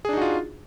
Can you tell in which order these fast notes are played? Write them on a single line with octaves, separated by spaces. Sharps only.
G#4 D4 D#4 F#4 F4